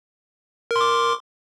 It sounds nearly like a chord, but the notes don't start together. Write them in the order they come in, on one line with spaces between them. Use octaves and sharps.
A#4 C6 D6